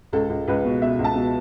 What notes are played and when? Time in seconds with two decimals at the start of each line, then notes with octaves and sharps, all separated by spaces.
0.13 C#2 A4
0.30 C#2
0.48 C#2 B4
0.65 B2
0.82 B2 E5
0.99 C#2
1.04 A5
1.15 B2